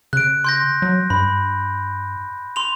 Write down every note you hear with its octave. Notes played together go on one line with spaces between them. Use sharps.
C#3 F#6 D7
C6 G6 A#6
F#3
G2 B5
C6 F7